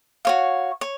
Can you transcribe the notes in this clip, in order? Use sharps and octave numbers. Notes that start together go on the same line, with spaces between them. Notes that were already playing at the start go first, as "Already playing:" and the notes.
F#4 C#5 F5
C#5